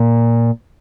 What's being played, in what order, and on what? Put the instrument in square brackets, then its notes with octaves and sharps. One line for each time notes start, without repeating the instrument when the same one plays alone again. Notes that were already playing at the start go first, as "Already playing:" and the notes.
Already playing: [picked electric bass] A#2